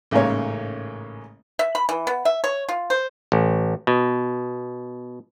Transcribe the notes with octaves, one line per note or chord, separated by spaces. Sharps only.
A1 G#2 C#3 A#3 C#5
E5
B5
E3
B3
E5
C#5
F4
C5
A1
B2